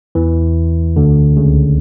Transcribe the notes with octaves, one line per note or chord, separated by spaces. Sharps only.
E2 E3
D2 D3
C#2 C#3